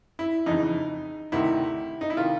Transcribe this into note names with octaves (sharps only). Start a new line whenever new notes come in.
E4
F2 C#3 E3 D#4
D2 C3 D#3 E4
D#4
E4
C3 D#3 F4